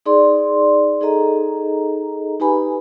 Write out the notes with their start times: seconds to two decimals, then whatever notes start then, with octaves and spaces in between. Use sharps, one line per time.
0.06 D#4 G#4 D5 C6
1.01 D#4 G#4 A4 D#5 A#5
2.40 D#4 G4 B4 G#5 B5